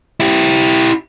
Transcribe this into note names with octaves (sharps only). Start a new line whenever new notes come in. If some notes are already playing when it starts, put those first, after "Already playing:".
E4 G4